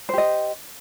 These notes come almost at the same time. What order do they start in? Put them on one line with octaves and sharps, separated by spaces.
C5 G4 D#5